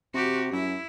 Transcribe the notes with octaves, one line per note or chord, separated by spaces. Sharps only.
C3 F#4 G4
F#2 E4